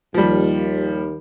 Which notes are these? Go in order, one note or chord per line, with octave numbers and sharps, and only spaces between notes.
D#2 F3 G3